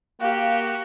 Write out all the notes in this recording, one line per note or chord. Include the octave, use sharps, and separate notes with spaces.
A#3 F#4 G4 F5